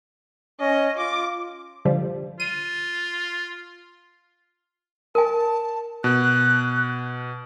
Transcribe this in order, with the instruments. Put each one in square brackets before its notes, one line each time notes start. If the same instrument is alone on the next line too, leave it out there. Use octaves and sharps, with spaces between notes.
[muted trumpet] C#4 [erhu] D#5
[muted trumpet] F4 [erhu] D6
[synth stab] D3 F3 G3
[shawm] F4 [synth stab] D#7
[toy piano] A#4 G#5 [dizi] A5
[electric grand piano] B2 [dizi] F#6